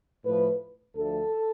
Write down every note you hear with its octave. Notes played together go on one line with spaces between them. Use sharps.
A2 F3 A3 B4
D2 D3 F3 A3 A4